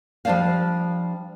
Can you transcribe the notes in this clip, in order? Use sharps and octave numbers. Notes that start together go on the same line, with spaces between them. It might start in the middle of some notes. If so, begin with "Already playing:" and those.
F3 G3 D4 C5 D5 F5